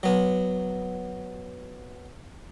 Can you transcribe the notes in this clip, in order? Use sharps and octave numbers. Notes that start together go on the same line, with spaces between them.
F#3 B3